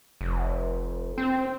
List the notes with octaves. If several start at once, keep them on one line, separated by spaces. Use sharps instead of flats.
F1
C4